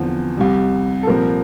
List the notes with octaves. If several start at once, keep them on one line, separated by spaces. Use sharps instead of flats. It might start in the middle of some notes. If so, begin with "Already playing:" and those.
Already playing: E2 D3 F3 C4
C2 C3 G3
A4
C2 A#2 F3 C4 A#4